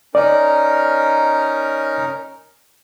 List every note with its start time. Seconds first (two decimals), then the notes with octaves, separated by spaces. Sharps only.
0.15 C#4 D#4 A#4 D5